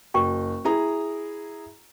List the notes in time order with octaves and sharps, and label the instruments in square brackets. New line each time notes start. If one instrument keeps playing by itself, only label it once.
[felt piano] F#1 [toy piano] F#4 G5 C#6
[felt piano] E4 G#4 A#5